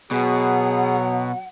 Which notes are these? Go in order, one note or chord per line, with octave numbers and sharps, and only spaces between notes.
B2 F#3 G#4 F#5